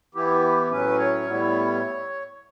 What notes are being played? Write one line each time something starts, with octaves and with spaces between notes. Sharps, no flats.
E3 B3 E4 G4
A2 F#3 C#4 B4
C#5
A2 G3 B3 E4